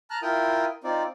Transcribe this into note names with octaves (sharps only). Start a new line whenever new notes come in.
A5 A#5 F6 F#6
E4 F4 A#4 G5 D#6
C4 D#4 F4 D5